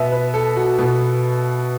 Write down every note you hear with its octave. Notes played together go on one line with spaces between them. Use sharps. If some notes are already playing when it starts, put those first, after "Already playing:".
Already playing: B2 B3 E5
B4
A4
F#4
B2 B3